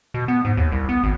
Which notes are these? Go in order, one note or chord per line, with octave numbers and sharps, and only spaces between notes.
B2
B3
G#2
D#2
C2
B3
G#1